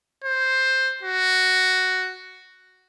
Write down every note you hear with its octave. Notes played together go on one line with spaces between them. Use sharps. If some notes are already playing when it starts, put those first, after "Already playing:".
C5
F#4